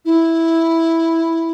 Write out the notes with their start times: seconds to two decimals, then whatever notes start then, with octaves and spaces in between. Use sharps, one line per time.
0.05 E4